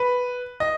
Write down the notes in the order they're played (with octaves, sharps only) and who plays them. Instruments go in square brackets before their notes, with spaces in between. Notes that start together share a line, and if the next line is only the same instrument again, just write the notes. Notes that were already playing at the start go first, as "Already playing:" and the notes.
Already playing: [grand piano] B4
D#5